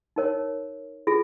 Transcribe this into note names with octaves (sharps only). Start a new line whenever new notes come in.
D#4 A#4 C#5
F4 G#4